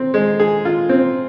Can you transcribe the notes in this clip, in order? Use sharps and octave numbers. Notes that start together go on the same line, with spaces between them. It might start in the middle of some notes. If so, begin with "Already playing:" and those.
Already playing: C4
G#3
G#4
F4
C4